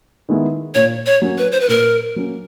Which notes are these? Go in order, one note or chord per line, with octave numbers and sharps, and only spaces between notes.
D#3 G#3 B3 E4
A#2 C#5
C#5
F#3 A#3 C#4
B4
C5
B4
A#2 A#4
F#3 A#3 C#4